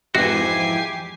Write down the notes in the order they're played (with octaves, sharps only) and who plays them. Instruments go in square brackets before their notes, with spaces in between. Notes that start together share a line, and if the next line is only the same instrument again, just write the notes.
[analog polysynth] F2 G#2 E3 [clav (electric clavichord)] F#4 [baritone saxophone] G4 [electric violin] G#5 C7